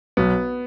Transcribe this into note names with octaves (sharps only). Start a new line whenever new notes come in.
B1 B3